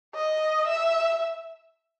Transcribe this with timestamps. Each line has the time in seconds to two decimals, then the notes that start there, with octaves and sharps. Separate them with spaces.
0.15 D#5
0.67 E5